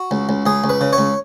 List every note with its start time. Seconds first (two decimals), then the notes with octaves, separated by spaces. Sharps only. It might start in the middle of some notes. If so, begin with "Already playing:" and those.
Already playing: F#4
0.11 C#2
0.29 C#2
0.46 C#2 G#4
0.64 C#2
0.69 B4
0.81 C#3
0.93 C#5
0.98 C#2